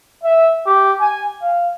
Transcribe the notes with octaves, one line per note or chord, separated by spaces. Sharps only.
E5
G4
G#5
F5